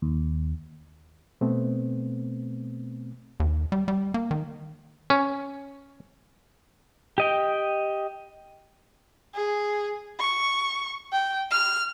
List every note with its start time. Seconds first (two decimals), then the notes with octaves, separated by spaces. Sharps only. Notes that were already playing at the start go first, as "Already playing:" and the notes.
0.02 D#2
1.41 B2 A3 B3 C4
3.40 D#2
3.72 G3
3.88 G3
4.14 A#3
4.31 D#3
5.10 C#4
7.18 G4 D#5 G5
9.34 G#4
10.19 C#6
11.12 G5
11.51 F6